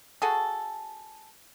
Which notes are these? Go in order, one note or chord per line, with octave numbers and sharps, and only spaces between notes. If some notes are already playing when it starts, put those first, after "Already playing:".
F#4 G#4 A4